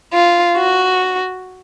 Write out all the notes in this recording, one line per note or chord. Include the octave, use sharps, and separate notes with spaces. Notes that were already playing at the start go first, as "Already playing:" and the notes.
F4
F#4